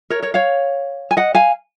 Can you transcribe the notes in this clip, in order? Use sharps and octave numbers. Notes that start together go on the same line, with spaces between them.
A#4 C#5
A#4 C#5
C#5 F5
G#5
D#5 F#5
F5 G#5